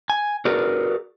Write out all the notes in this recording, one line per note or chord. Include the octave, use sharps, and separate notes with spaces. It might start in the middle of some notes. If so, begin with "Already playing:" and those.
G#5
F#4 G#4 A#4 B4 D5